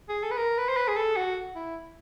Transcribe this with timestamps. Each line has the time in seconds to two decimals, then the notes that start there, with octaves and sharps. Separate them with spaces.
0.09 G#4
0.23 A4
0.31 B4
0.37 A#4
0.58 B4
0.69 C5
0.77 B4
0.88 G#4
0.96 A4
1.16 F#4
1.55 E4